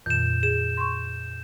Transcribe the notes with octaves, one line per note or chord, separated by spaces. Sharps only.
F2 A#2 D#3 G6 E7
G#4 E7
C6 C#6